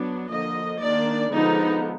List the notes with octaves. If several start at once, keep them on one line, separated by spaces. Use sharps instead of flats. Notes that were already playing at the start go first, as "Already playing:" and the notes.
Already playing: F#3 B3 D4
D3 F3 A#3 D#5
D#3 A#3 D4 D5
D3 F3 G#3 B3 D#4